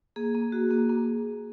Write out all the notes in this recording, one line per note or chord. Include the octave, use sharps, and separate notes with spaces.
A#3 G#4
A#3
F#4
A#3
A#3